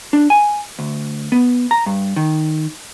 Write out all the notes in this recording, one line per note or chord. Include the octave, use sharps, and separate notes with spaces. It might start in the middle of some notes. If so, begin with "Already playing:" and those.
D4
G#5
D2
B3
A#5
G2
D#3